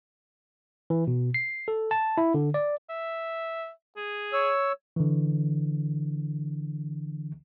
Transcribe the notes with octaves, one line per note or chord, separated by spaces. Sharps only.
E3
B2
C7
A4
A5
E4
D3
D5
E5
G#4
C#5 E6
D3 E3